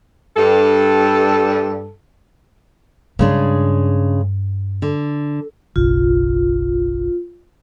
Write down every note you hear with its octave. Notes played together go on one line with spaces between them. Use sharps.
G2 A4
G2 C#3 G#3 D4
D3
F#1 B1 F4